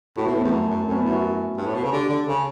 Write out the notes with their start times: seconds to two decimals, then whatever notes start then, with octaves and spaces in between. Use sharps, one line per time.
0.17 A2 F#4
0.26 B2 E4
0.35 A2 B3
0.44 E2 A3
0.52 F#2 B3
0.69 F#2
0.87 F#2 A3
0.92 C#4
0.96 B3
1.05 F#2 E4
1.13 F#4
1.57 G2
1.66 A2
1.75 B2
1.80 C#3 A4
1.92 D3 G4
2.09 D3
2.27 C#3 A4